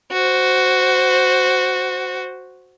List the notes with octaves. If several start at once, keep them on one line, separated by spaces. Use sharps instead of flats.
F#4 C5